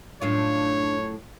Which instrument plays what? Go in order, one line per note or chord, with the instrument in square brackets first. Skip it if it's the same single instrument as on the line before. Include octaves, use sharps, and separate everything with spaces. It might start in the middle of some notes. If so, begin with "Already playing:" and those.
[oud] F#2 A2 F4 [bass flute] D4 [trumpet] C#5